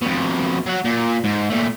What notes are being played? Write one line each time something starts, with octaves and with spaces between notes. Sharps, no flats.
F2 B2
F#3 F#5
A#2
G#2
A#2 A3